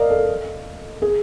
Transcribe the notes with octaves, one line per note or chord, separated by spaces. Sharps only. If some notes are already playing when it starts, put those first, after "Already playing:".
Already playing: A#4 D5 D#5 F5
A4
G#4